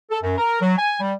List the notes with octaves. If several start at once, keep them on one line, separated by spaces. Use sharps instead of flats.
A4
F#2
A#4
F#3
G#5
G3